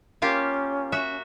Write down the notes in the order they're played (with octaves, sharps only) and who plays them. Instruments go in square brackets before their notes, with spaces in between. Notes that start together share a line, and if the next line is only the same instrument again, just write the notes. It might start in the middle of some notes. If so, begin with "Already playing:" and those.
[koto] A#3 F4 G4 [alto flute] C#4
[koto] F#4 E5